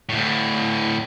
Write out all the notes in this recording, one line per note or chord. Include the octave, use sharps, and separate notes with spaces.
D2 A2